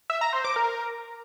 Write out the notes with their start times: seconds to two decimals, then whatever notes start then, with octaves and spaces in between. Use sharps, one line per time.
0.10 E5
0.21 A#5
0.33 C5
0.44 D6
0.56 A#4